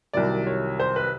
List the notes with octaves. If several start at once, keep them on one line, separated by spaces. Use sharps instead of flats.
C2 C3 D#3 F#3 D5
C#5
C5
B4